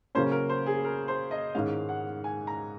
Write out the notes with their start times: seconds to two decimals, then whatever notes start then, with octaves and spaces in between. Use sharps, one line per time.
0.15 C#3 F#3 A#3 C#4 C5
0.31 A#4
0.49 C5
0.66 G#4
0.85 A#4
1.08 C5
1.31 D#5
1.54 G#2 D#3 G#3 C#4 F5
1.89 F#5
2.24 G#5
2.47 A#5